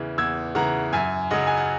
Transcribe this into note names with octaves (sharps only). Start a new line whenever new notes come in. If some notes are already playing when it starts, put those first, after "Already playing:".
Already playing: E2 C#3 E3
E2 E6 G#6
C#3 E3 F#5 A#5
F#2 E5 G#5
C#3 F#3 D#5 F#5
G#5
F#5